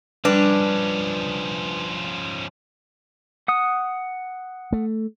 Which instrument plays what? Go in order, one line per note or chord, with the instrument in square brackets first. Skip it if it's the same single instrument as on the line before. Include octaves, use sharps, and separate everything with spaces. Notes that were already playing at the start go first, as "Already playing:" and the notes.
[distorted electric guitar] F3 C#4 [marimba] G3 [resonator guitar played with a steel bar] D4 [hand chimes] B4
[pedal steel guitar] F#5 D#6
[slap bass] A3